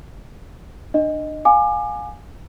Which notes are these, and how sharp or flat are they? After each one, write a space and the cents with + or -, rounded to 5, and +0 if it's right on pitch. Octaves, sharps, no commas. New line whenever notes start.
D4 +35 D#5 +0
F5 +30 G#5 +0 D6 +30